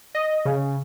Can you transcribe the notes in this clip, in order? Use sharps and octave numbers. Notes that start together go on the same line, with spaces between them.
D#5
C#3